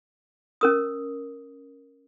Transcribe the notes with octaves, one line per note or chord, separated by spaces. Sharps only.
C#4 A#4 D#6